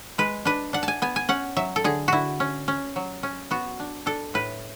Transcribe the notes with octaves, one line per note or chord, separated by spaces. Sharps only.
G#3 B4
D4 B4
D4 F#5
A5
G#5
B3 G#5
G#5
C#4 F#5
F#3 E5
A4
D3 G#4
D3 E4 F#4
C#4
C#4
F#3
C#4
B3 F#4
D4
D4 A4
A2 B4